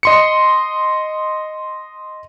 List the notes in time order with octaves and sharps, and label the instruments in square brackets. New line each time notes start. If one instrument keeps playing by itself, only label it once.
[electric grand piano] D#5 C6 C#7